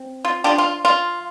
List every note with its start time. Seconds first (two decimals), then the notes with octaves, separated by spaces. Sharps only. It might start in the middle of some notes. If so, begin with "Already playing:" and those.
Already playing: C4
0.25 F4
0.44 F3 D4 F4 G4
0.58 F4
0.85 F4